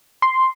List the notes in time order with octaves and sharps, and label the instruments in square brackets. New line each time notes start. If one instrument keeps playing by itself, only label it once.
[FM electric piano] C6